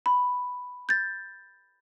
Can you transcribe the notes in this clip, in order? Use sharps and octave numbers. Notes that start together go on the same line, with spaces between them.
B5
G6 A6